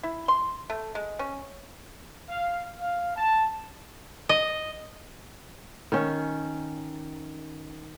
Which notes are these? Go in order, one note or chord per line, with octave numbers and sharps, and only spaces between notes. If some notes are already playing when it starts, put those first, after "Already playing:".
E4
C6
A3
G#3
C#4
F5
F5
A5
D#5
D#3 C#4